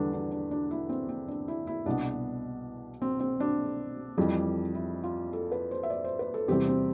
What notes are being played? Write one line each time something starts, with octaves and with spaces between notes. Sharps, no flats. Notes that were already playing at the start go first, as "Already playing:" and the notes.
Already playing: E2 D3 G3 D4 A4 B4
D4
D4
D4
E4
C4
C4
D4
E4
E4
C2 B2 B3 D4
C4
C4
D4
F2 E3 G3
E4
F4
A4
B4
C5
E5
D5
C5
B4
A4
E2 C3 G3 C4 G4
C4